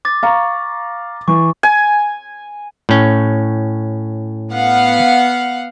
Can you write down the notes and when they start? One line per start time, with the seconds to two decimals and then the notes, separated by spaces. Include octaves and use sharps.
0.05 D6 A6
0.23 F5 A#5 C#6
1.28 E3 C#6
1.63 G#5
2.89 A2 C#4
4.53 B3 F5 F#5